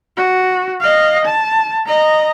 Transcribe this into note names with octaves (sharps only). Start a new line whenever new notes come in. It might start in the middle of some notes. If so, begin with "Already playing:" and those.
F#4
D#5 F5
A5
D#5 A#5